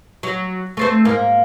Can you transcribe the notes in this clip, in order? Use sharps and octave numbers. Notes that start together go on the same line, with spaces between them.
F#3
A3 C4 C5
G#2 A#3